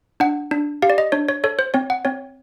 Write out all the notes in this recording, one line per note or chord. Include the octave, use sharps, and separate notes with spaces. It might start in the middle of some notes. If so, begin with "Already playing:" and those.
D4 F#5
D4
G4 F5
D5
D#5
D4 C#5
C#5
A4 C#5
C5
C4 C#5
F#5
C4 C#5